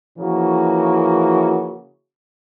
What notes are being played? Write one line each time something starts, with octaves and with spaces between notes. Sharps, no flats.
C#3 E3 F3 A#3 F#4